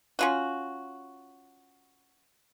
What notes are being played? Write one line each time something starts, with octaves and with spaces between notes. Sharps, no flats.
C#4 F4 F#4